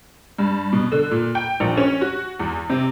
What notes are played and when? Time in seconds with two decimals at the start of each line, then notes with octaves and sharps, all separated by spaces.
0.38 G2
0.73 B2
0.92 D3
1.11 A#2
1.35 G5
1.60 A#1
1.77 C#4
2.01 F#4
2.39 E2
2.70 C3